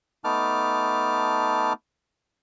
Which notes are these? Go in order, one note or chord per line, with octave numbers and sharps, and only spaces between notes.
A3 B3 D#4 A5 D6 F6